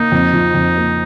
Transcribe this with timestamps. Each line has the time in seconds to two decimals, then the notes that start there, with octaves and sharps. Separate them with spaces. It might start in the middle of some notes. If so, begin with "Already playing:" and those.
Already playing: A#3 D#4
0.12 F2
0.34 F3
0.55 F2
0.77 A#3